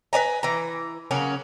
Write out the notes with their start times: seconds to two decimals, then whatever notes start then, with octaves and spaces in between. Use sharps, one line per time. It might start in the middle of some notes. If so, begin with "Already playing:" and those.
0.13 B4 D5 G#5 A#5
0.43 E3 A#5
1.11 C#3 F#3 A#3 C#4